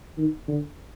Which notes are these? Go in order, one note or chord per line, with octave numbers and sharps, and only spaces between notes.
D#3
D3